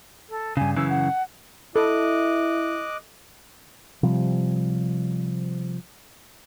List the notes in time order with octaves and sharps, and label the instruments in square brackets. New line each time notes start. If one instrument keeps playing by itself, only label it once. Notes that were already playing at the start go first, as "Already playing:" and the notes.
[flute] A4
[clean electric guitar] G2 C#3 [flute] G#5
[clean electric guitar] F#2 C#3 E3 [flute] E6
[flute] F#5
[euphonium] E4 [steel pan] A4 [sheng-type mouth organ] D#5 D6 F#6
[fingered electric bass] C3 F3 G3